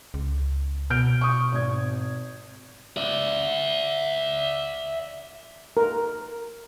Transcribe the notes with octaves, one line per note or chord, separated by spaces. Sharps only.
C#2
B2 F6 G6 D7
C#6 D#6
G#1 G#6
D5 E5
A#4